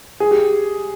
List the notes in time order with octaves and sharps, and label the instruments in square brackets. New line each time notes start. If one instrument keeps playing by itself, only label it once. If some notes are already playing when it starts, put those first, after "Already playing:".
[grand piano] G#4
G4